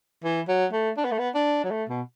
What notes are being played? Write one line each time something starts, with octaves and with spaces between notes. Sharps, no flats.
E3
F#3
A3
D4
B3
A3
B3
D4
F#3
A3
B2